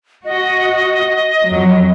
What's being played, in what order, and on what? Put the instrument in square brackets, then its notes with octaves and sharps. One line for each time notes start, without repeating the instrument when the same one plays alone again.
[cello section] F#4 [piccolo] D#5
[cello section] F2 F#3